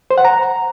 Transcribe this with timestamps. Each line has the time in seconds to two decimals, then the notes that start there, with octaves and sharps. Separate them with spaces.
0.11 C5
0.18 F#5
0.25 A#5